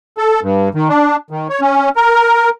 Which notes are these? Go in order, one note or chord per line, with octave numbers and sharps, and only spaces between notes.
A4
G2
D#3
D4
D#3
C#5
C#4
A#4